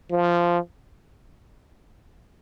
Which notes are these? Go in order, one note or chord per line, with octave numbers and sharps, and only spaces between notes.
F3